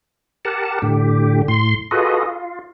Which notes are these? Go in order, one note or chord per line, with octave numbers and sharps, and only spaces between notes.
G4 A#4 F#5 A5
A2 D3 G4
A2 C6
F4 F#4 G#4 A4 B4 D#5
F4